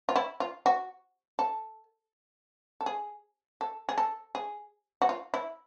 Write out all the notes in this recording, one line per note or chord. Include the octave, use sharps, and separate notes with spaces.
F4
E4
F4
F#4
A4
A4
G#4
A4
G#4
A4
G#4
F#4
F4
E4